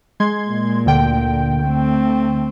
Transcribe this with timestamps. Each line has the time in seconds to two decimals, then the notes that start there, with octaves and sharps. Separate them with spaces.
0.20 G#3 C6 G#6
0.50 A#2
0.86 D2 D3 G5
1.64 A3 C4